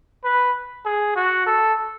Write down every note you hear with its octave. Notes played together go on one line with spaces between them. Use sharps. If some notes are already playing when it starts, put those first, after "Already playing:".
B4
G#4
F#4
A4